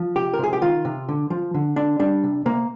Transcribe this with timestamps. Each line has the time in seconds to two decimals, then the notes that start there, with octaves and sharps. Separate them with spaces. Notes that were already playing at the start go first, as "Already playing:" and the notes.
Already playing: F3
0.16 C3 G4
0.34 A#4
0.39 C3 G#4
0.53 G4
0.61 D#3 F4
0.85 C3
1.09 D3
1.30 F3
1.54 D3
1.76 D3 D4
2.00 G3 D4
2.24 C3
2.46 C3 A#3